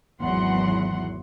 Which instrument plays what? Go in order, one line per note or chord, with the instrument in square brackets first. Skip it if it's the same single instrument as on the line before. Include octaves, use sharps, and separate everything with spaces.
[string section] G#1 E2 E3 F#3 F#5 C6